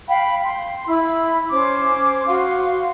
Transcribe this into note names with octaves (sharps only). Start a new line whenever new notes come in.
F5 G5 B5
C6
E4 B5 E6
C#4 C5 D6
F#4 F5 C6